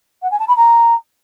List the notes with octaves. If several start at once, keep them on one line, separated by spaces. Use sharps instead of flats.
F#5
G#5
A5
B5
A#5